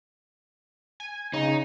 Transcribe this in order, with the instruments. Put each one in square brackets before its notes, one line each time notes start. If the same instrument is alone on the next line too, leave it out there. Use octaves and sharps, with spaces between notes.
[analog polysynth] G#5
[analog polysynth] C#3 [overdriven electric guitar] D#4